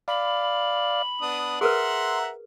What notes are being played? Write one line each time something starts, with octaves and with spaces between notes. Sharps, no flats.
D5 F5 B5
B3 D4 D#6
G#4 A#4 B4 E5 F#5 A#5 C6